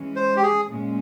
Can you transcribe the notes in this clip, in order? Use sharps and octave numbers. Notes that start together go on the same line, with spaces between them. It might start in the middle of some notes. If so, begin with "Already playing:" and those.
Already playing: E3 G#3 C#4
C5
G4
G#4
A#2 G#3 C#4